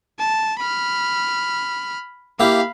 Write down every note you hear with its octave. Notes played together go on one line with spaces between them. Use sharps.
A5
B5 F6
A#3 E4 G4 F5 B5